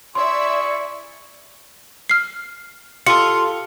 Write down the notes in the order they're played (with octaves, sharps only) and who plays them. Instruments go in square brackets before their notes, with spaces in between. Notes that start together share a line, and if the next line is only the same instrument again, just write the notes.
[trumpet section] E4 G#4 C#6 [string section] D5 E5 [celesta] C6
[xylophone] F6 C7
[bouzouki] F4 [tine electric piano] G4 A4 [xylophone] C#7